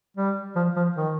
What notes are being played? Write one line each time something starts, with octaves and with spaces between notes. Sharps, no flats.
G3
F3
F3
D#3